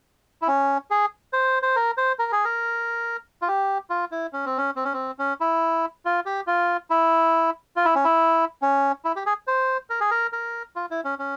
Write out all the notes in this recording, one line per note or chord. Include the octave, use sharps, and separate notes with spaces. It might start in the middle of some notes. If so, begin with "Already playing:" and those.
E4
C#4
G#4
C5
C5
A#4
C5
A#4
G#4
A#4
F4
G4
F4
E4
C#4
C4
C#4
C4
C#4
C4
C#4
E4
F4
G4
F4
E4
F4
E4
C#4
E4
C#4
E4
G4
G#4
C5
A#4
G#4
A#4
A#4
F4
E4
C#4
C#4